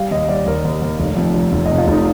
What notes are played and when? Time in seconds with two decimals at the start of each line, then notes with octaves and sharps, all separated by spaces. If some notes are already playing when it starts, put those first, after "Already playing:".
Already playing: G3 F5
0.11 D#2 D#5
0.29 G3 D5
0.46 D#2 A#4
0.65 D#2
0.82 D#2
1.00 F1
1.17 F2
1.34 F1
1.53 F1
1.65 C3 D#5
1.78 F4
1.88 F1 D#4